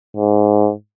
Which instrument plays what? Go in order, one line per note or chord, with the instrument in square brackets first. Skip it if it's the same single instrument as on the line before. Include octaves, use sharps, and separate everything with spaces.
[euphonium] G#2